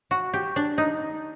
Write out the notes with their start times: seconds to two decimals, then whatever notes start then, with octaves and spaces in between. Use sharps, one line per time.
0.11 F#4
0.33 G4
0.56 D4
0.78 D#4